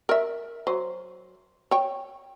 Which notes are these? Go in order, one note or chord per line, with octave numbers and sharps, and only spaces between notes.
A#4 E5
F#3 C5
C#5 G5